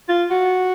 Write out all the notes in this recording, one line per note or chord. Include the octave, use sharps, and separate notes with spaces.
F4
F#4